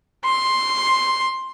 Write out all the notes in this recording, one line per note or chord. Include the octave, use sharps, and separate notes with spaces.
C6